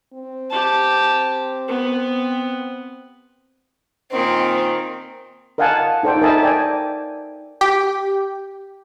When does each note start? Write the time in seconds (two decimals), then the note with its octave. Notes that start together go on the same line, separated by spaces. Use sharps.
0.14 C4
0.50 G4 A5
1.68 B3
4.12 A#2 D#3 C4
5.58 A#4 D#5 F5 F#5 G#5 A5
6.03 D#4 A4 C5 D5 G5
6.22 A#4 D#5 E5 G#5 A5 B5
6.43 D5 G5 G#5
7.61 G4